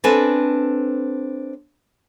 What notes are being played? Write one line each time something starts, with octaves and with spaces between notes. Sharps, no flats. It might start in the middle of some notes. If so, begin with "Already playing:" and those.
C4 D4 A4 B4 G#5 A5